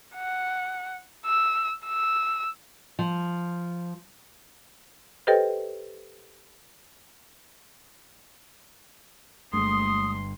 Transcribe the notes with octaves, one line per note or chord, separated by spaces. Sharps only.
F#5
E6
E6
F3
G4 A4 B4 C5 D#5 G5
G1 G2 G#3 A3 C6 D#6